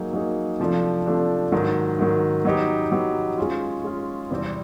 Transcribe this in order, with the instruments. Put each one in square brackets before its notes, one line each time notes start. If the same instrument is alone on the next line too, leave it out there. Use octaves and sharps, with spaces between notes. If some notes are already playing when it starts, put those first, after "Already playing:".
Already playing: [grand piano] F#3 A#3 D#4 G#4
F#3 A#3 D#4 G#4
C3 F3 A3 D4
C3 F3 A3 D4
G#2 D#3 F#3
G#2 D#3 F#3
F#3 B3 D#4 G4
F#3 B3 D#4 G4
G#3 C#4 F4
G#3 C#4 F4
E2 C3 E3 G3 C4